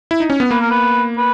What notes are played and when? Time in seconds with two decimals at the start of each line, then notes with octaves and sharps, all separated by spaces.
0.11 E4
0.20 D#4
0.30 C#4
0.40 B3
0.50 A#3 B4
0.60 A#4
0.70 B4
1.17 B4